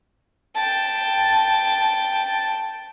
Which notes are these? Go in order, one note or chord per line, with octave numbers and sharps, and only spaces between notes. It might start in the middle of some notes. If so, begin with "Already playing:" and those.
G5 A5